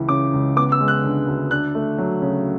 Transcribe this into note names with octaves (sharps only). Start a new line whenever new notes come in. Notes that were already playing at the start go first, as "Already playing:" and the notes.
Already playing: C#2 E3
C#3 D6
C#2
B3 D6
E6
G#3
F#6
D3
D2
D4 F#6
A3
F#3
C#3